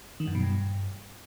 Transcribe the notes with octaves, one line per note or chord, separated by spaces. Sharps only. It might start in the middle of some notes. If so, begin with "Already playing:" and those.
D#3
F#2
B2
G2